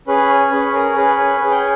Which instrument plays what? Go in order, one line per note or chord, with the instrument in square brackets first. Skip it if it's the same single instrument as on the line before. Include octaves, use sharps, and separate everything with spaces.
[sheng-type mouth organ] C#4 G#4 B4
C#5
C#4 G#4 B4
A#4
C#4 G#4 B4
B4
C#4 G#4 B4
G5